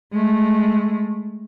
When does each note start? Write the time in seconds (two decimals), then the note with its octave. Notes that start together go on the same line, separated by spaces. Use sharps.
0.12 G#3 A3